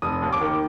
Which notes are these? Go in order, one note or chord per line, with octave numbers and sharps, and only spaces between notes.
F1 D#6
D#2
D6
D#3